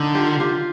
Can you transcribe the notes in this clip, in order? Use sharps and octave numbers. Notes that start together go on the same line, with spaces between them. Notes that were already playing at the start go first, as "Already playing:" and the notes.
Already playing: D3 D#4
F4 G4
F4 G4